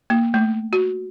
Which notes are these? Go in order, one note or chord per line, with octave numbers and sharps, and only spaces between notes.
A#3
A3
F#4